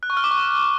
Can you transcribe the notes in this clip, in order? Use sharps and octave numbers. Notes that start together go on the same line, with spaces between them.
F#6
C#6
F6
D6
C#6